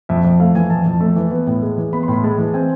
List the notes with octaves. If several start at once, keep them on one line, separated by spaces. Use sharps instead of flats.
F2 E5
F2
A3 F5
E3 G#5
F2 A5
F2
A3
E3
B3
A2
G#3
E3
B3 B5
C6
A2
B5
G#3 A5
E3
C4 G#5